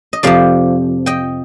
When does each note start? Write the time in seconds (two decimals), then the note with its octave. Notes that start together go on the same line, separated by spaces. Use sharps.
0.13 D#5
0.23 F2 C3 F3 D5 F5
1.06 D#5 G5